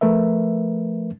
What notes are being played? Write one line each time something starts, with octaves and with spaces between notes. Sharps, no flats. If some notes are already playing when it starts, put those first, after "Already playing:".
F3 A3 A#4 B4 E5